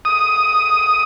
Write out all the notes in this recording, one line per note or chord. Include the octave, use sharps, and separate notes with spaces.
D#6